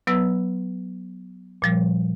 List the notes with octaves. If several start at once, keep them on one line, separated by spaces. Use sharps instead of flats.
F#3 B3 B4 E6
A#2 F3 G3